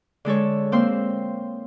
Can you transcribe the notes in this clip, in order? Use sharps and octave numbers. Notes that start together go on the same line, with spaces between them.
D3 G#3 A4 C#5
A#3 C4 C5 C6 E6